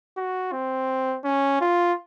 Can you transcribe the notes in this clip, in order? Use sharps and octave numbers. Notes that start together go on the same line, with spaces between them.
F#4
C4
C#4
F4